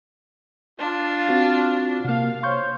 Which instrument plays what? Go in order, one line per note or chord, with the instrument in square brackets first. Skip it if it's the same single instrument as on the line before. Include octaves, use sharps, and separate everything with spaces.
[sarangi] D4 [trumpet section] F4
[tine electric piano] C4 F#4 A6
[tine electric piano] C3 A#3 [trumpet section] F5
[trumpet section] C5 C#5 [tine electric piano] C6 C#6 G6